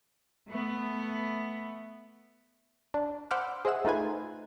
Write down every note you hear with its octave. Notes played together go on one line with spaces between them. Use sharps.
A3 B3
D4
C5 F#5 B5 D6 E6 F6
G#4 C5 D#5 E5 F#5 E6
A3 D#4 F4 B4 G#5